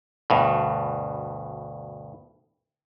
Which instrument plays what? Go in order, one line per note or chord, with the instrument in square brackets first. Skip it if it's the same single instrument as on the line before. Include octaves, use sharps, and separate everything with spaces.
[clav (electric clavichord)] D2 G2 B2